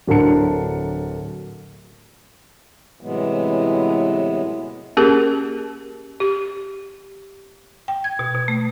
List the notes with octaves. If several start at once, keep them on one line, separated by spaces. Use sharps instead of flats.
D1 D3 F#3 A#4 A5 C#7
A2 C3 E3 F#3 G#3 B3
A#3 C#4 G4 G#4 A#4
G4
G5
G#6
B2
B2
A3